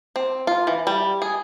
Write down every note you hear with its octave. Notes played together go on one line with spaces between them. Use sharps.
C4
F4
E3
G3
G#4